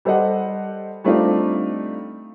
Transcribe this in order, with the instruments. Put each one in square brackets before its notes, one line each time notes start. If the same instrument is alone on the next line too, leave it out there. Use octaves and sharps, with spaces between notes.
[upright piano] G3 A4 C5 D#5 F#5
G3 A3 C4 D4 D#4 F4